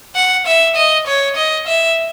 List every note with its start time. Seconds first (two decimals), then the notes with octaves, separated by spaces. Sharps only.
0.15 F#5
0.47 E5
0.76 D#5
1.07 C#5
1.36 D#5
1.67 E5